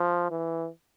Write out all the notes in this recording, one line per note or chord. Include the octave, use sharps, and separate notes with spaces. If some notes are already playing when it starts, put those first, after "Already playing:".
Already playing: F3
E3